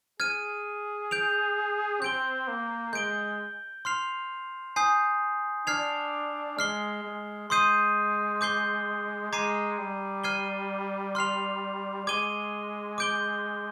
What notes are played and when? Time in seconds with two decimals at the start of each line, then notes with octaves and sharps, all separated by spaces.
0.20 G#4 F6 G#6 D#7
1.11 G6 D7 F7
2.01 C4 G6 D7 G7
2.48 A#3
2.93 G#3 G6 D7 G7
3.85 C6 F6 C7 F7
4.76 G#5 D#6 G6 C7
5.67 D4 F6 G#6 C7 F7
6.58 G#3 F6 C7 G7
7.04 G#3
7.49 G#3 C6 D#6 G6 C7 D#7
8.41 D6 G6 C7 G7
9.32 G#3 A#5 D6 G#6 C7 D#7
9.79 G3
10.24 F6 G#6 C7 D#7 G7
11.15 C6 F6 C7 F7
12.06 G#3 D6 G#6 D#7 G7
12.98 D6 G6 D7 G7